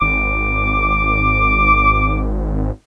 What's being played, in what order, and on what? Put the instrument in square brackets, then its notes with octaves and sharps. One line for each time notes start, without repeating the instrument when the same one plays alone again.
[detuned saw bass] G#1 [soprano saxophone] D6